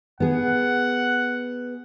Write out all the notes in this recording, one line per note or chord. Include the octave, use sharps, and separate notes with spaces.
B3 G#4 F#5